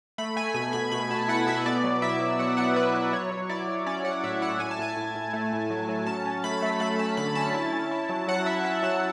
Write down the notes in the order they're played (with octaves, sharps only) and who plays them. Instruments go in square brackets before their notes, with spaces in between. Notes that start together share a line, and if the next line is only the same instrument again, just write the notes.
[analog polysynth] A3 B5
A3 G#5
B2 G#5
B2 B5
B2 B5
B2 A5
E4 F#5
B2 E5
B3 D5
F#3
E4 E5
F#3
F#3 F#5
B3 F#5
F#3 B4
F#3 B4
F#3 C#5
F#3
E4 D5
F#3
C#4 D5
F#3 F#5
A2 E5
E4 F#5
A2 G#5
A5
A2 G#5
A2
A2
A3
A2
F#3
F#3
C#4 A5
C#4
A3 B5
A3
A3 B5
C#4 A5
D3 B5
C#4 A5
E4
C#4
E4
F#3
F#3 F#5
E4 E5
C#4 E5
F#3 A5